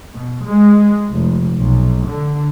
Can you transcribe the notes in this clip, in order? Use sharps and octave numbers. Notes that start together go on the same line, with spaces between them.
B2
G#3
F1
B1
D3